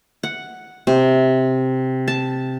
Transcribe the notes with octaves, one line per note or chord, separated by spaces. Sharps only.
F#5
C3
A5